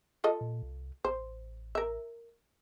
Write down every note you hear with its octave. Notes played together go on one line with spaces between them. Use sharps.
F4 A4 D#5
A#2
C2
A1 C5
A#4 E5